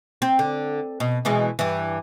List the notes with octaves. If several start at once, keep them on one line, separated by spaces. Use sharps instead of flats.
C4
D3
B2
B2 E3 G#3
G2 E3